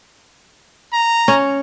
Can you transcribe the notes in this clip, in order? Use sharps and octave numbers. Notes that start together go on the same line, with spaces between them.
A#5
C#4